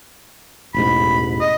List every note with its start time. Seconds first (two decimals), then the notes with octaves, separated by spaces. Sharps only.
0.74 E1 A1 G#2 B5
1.41 D#5